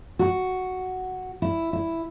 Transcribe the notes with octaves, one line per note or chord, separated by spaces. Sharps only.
F#4
E4
E4